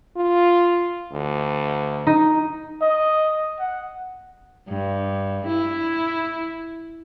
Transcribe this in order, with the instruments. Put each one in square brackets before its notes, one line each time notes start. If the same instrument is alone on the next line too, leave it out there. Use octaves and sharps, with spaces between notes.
[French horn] F4
D2
[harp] D#4
[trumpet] D#5
F#5
[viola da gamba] G2
E4